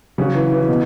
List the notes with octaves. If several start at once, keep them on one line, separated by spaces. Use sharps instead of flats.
C#3 F#3 C#4 F#4
E3
E3
B2